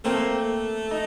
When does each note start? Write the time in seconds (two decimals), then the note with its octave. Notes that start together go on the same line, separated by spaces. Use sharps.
0.05 A3 A#3 C4
0.91 D#4